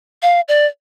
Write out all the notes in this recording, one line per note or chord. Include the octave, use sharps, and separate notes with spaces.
F5
D5